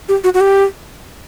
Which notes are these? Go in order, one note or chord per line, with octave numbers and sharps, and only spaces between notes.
G4
F#4
F#4
G4